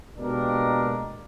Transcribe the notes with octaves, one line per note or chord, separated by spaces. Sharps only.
B2 G#3 A#3 D4 G4 A#4